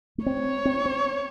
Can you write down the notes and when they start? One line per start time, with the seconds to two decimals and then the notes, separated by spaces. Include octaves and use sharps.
0.18 A3
0.26 C4 C#5
0.65 C4
0.86 C4